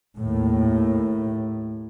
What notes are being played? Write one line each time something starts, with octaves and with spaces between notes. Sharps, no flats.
D#2 A2